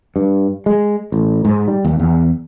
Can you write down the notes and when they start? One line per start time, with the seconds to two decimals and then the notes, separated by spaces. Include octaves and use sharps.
0.16 G2
0.66 G#3
1.12 A1
1.45 G#2
1.68 G3
1.85 D#2
1.99 E2